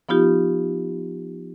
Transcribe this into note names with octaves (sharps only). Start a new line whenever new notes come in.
F3 B3 D#4 F4 G4